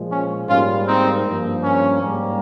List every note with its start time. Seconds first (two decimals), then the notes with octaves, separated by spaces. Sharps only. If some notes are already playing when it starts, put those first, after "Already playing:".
Already playing: A#2 F3 G#3
0.11 C#4
0.48 G#2 G3 A#3 C#4 F4
0.86 C4 D#4
1.24 G2 F3 A#3
1.62 C#4
2.01 G#2 G3 A#3